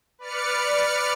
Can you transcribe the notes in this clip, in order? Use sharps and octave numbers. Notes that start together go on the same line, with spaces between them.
B4 D5 F6 C#7